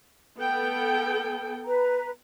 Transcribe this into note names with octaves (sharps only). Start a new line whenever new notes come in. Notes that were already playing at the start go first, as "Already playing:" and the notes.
B3 A4 G5
B4 A#5